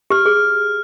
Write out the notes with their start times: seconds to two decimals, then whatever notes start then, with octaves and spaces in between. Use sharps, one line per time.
0.10 G4 F6
0.26 G#4